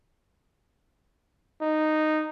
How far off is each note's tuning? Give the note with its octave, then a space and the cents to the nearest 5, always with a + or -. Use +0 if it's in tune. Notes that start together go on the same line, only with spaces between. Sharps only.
D#4 -10